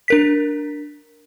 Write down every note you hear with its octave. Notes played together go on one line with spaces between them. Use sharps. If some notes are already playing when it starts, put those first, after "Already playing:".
D4 A#4 B6